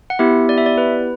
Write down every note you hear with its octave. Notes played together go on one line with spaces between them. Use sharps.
F#5
B3 E4 G4 E5
D5
E5
D5
B4